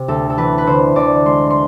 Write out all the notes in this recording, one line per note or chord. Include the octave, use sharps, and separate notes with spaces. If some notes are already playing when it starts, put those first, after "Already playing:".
Already playing: C3
D2 A4
A4
E3 B4
B4
D3 C5
D2 D5
G#3 C6
C6